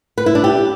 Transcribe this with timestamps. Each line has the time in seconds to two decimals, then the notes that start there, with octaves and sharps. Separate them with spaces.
0.18 B4
0.26 E4
0.35 D4
0.44 G4